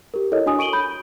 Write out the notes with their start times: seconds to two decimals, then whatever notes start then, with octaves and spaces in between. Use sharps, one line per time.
0.14 G4 A#4
0.32 E4 A4 A#4 C#5 D#5
0.46 D4 F#4 G#5 D#6
0.59 C#6 D7 D#7 F#7 G7
0.73 B5 G6